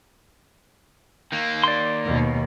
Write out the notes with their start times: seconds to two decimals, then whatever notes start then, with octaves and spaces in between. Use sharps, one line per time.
1.32 D#3 A#3
1.63 D5 C6
2.07 D#2 B2